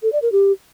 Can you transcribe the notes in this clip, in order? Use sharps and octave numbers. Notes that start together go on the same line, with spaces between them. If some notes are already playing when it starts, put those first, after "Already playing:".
A4
D5
A#4
G4